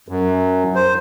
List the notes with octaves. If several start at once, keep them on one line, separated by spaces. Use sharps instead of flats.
F#2
C5